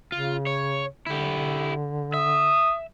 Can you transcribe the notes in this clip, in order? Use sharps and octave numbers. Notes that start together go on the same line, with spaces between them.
C#3 F4
C#5
D3 E4 G4
E5 D#6